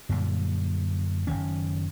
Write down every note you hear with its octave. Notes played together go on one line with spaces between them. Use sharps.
F#2 A#2 D3 G3
F#1 D#2 D#3 C#4